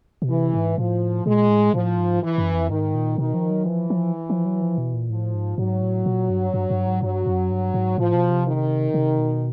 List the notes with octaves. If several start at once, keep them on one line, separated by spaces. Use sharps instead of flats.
B2
C3 E3
G#2
A2 F3
A#2 G#3
A2
A2 F3
G#2
E3
F#2
F2
G#2 D#3
A#2
B2 D#3
F3
F#3
E3 F3
F3
F3
F#3
F3
B2
A#2
A2 F3
G#2
G#2 F#3
A2
A#2
G2
G2
G2
G#2
G2 F#3
F#2
G2
G#2
A2 F3
B2
C3
D#3
C3
B2